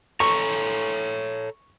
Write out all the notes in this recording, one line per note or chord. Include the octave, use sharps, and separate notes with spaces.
A4 C#5 A#5 C#6